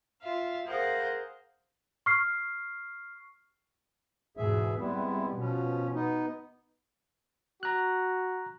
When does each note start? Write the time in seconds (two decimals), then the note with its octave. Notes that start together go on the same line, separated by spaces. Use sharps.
0.22 F4 E5 F5
0.66 G#4 A#4 C5 F5 F#5
2.06 C#6 F6 C7
4.37 E2 G#2 B2 G#4 E5
4.79 C3 G3 G#3 B3 E4
5.39 B2 F3 C#4
5.94 B3 D#4
7.63 F#4 A#5 F#6